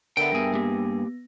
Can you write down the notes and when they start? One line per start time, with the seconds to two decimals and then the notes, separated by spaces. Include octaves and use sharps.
0.17 D3 B3 A#4 E5 G5
0.32 G2 B3 G#4 A#6
0.54 A#3 G4